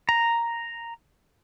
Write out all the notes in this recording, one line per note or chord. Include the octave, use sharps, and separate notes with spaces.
A#5